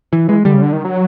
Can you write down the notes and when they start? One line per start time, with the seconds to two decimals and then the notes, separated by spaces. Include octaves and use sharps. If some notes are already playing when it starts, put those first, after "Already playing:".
0.13 E3
0.28 E3 G#3
0.45 D3 G3
0.53 C#3
0.62 D3
0.73 D#3
0.85 F#3